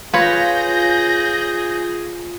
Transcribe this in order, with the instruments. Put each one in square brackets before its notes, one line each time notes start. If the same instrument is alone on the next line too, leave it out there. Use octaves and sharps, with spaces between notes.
[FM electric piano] F4 [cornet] G#4 [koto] B4 C#5 [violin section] G6 A#6